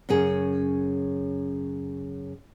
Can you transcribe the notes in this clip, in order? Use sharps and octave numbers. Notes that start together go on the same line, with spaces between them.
F#2 C#3 G#4